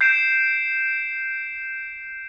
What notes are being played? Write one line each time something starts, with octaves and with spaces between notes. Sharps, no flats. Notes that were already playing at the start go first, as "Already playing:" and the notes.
G6 C7 D7 E7